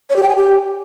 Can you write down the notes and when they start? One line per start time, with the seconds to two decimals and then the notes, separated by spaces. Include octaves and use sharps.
0.10 C#5
0.16 G4
0.23 G5
0.29 G#5
0.36 G4